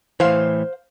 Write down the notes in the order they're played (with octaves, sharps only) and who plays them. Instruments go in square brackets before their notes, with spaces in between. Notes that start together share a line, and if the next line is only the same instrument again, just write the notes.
[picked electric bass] A2 E3 [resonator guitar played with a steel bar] C5 F5